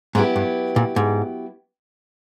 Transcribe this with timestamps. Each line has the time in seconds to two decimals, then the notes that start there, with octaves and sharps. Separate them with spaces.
0.15 G#2 F#3 B3 E4 G4
0.36 G2
0.76 A#2
0.96 G#2